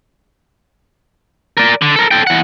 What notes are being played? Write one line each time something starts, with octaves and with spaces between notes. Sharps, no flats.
A#4 D5
D3
A4 A#4
A4 G5
E3 F#5